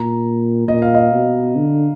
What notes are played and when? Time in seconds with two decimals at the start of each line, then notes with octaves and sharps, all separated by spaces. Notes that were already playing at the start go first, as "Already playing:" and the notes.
Already playing: A#2 A#5
0.68 A#2 D#5
0.82 F5
0.95 D#5
1.13 B2
1.56 D3